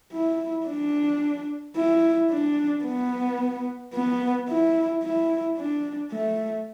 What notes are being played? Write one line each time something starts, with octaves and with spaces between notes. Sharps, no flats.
E4
D4
E4
D4
B3
B3
E4
E4
D4
A3